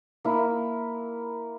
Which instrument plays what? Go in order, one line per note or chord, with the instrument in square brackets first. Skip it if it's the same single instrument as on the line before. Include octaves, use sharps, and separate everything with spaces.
[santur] A#3 E4